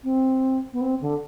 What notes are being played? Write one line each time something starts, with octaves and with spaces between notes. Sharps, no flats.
C4
B3
C4
D3